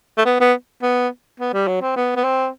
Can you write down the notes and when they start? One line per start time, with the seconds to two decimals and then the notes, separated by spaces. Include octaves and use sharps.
0.18 A3
0.25 B3
0.40 B3
0.83 B3
1.40 B3
1.53 G3
1.68 F#3
1.81 C4
1.96 B3
2.16 B3
2.24 C4